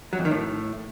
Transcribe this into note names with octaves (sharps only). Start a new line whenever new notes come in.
F#3
F2
D#3
A2